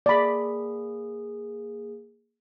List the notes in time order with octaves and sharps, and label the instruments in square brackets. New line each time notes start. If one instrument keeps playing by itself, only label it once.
[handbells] A#3 G#4 [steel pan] D5 B5